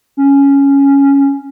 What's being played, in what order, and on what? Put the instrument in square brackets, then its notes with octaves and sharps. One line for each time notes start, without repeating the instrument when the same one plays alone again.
[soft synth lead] C#4